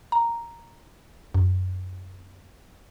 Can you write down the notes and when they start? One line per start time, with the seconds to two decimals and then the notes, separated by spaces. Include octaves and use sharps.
0.12 A#5
1.34 F#2